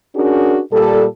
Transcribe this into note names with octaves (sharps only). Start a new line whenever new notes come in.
C#4 D4 F#4 G#4 A#4
A#2 G3 A4